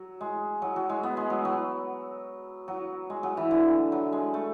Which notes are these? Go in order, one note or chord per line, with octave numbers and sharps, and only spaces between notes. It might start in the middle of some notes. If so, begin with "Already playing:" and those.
Already playing: F#3
G#3
F#3
F#3
G#3
B3
G#3
F#3
F#3
F#3
G#3
F#3
E3
D3
F#3
G#3
A3